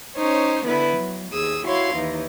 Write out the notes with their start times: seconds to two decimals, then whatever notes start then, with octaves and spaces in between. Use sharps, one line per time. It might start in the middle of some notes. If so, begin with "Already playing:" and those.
0.16 C#4 D#4 C5 C#5
0.65 D3 B3 E4 B4
0.97 F#3
1.32 D#2 G#4 D#6 E6
1.66 E4 F#4 C#5 F5 C6
1.94 D#2 E3 D#4